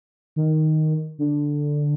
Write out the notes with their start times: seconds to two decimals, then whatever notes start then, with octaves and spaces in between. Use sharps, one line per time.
0.36 D#3
1.18 D3